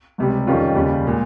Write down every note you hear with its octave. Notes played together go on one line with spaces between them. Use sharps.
C#2 C3 G3
F2 D#3 G3 C#4 F4
D#2 C#3 G3
A#2 G#3